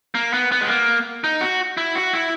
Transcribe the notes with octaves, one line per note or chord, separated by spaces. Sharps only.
A#3
B3
B3
G#3
A#3
D#4
F#4
E4
F#4
E4